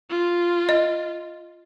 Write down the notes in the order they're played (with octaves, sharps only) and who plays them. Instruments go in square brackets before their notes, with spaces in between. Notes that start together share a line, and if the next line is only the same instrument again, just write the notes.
[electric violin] F4
[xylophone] D#5